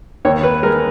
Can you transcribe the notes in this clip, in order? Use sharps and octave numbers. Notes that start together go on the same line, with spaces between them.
D#2 C#5
B4
G#3 A#4